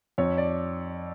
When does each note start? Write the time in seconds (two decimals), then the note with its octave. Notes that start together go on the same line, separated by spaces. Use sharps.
0.18 F2 C#5
0.38 D5